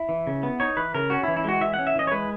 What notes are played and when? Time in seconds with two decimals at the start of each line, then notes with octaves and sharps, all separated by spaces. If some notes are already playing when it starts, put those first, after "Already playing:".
Already playing: E4
0.09 E3
0.27 C#3
0.43 B3
0.60 D#4 C#5
0.77 E3 B4
0.94 C#3 A#4
1.10 C#4 F#4
1.23 E4
1.28 E3
1.37 E4
1.44 G#3 F#4
1.61 E3 E5
1.74 C#4 F#5
1.87 E5
1.96 E3 D#5
2.07 C#5
2.11 G#3 B4